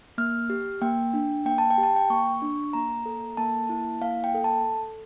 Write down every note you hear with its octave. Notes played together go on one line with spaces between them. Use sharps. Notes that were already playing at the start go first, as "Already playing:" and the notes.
A#3 F6
G4
A#3 G5
D4
A#3 G5
A5
G5
G4
A5
G5
A#3 C#6
D4
A#3 A#5
A4
A#3 A5
E4
A#3 F5
G5
A4
A5